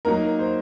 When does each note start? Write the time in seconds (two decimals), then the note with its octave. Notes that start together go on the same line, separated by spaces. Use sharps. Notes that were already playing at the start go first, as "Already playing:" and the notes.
0.05 F#3 A#3 D#4 A#4
0.39 C5